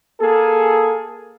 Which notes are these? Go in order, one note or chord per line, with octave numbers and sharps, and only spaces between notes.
A#3 G#4 A4